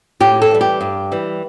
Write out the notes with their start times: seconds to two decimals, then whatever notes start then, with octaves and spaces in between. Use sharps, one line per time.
0.20 A2 G4
0.42 A4
0.51 E3 G3
0.61 G4
0.81 G2
1.12 E3 G3